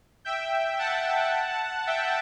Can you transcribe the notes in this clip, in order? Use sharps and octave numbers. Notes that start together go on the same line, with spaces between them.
E5 G5
F#5 A5
E5 G5